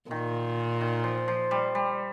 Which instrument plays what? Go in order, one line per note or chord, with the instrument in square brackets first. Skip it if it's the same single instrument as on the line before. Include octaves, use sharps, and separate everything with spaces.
[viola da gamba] A#2 [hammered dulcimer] D#3
[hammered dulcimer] D#3
F3
F3
G3
G3